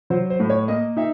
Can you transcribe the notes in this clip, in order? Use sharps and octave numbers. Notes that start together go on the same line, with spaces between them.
F#3 C5
C5
A2
C#5
A#3 D#5
D#4 E5